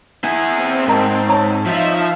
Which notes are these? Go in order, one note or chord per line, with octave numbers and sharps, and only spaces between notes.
E4 G#4
C4
G#2 A#4 D#5 A5
C#5 A5
F3 D#4 F4 E5